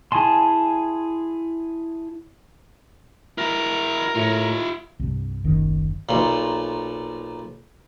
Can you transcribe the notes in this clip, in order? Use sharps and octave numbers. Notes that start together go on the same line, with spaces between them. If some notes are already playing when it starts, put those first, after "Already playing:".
E4 G#4 G#5 A5 C6
E4 F#4 A#4
A2 F4 E5
C2 G2
F#1 B1 F#2 D#3
B1 A#2